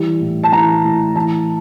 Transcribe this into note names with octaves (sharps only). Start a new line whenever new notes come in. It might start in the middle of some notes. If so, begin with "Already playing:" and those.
Already playing: E3 G3
A2
A5
E3 A#5
A2
E3 A5